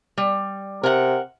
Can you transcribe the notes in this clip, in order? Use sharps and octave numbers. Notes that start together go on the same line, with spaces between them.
G3
C3 A#4 F#5